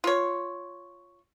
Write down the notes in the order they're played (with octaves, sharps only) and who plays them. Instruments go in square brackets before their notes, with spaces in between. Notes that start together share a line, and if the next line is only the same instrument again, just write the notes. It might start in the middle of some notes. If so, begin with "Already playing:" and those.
[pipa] F4 C#5